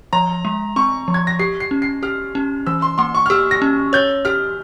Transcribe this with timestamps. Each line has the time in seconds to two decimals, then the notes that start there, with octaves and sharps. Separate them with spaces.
0.13 F3 A#5
0.45 G#3
0.76 C4 C#6
1.08 F3
1.14 G#6
1.27 A#6
1.39 G4 C7
1.60 C7
1.71 C#4
1.82 C7
2.03 G4 F6
2.35 C#4
2.67 E3 E6
2.82 C6
2.98 A#3 C6
3.15 C#6
3.26 F6
3.30 G4 E6
3.51 A#6
3.62 C#4
3.93 C#5 G6
4.25 G4 F6